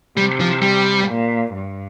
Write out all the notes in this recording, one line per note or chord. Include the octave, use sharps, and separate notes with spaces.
C3 G3
F3
G3
A#2
G2